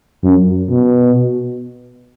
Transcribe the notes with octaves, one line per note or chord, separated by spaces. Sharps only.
F#2
B2